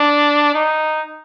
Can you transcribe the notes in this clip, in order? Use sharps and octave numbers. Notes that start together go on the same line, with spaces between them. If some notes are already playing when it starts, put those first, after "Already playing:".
Already playing: D4
D#4